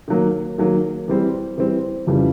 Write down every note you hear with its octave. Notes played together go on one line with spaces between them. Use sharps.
D#3 F#3 A#3
D#3 F#3 A#3
E3 G3 C4
E3 G3 C4
F2 C#3 E3 G3